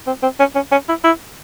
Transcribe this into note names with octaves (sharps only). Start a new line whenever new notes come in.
C4
C4
C#4
C#4
C#4
E4
E4